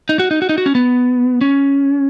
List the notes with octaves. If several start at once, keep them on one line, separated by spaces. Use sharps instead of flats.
D#4
F#4
D#4
F#4
D#4
F#4
C#4
B3
C#4